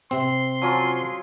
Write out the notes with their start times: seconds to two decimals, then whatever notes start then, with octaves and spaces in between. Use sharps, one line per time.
0.11 C3 C4 C6
0.62 F3 F#3 C#4